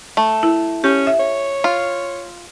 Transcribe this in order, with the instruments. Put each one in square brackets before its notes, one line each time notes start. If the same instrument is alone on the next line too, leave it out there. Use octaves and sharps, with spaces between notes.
[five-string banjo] A3
[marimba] E4
[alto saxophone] C#4 [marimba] G4
[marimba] E5
[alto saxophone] C#5
[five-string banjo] F4